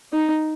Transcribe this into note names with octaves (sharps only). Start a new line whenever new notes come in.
D#4